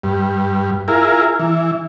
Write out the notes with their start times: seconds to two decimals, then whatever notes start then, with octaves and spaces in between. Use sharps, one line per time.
0.03 G2
0.88 E4 F4 G#4 A#4
1.39 E3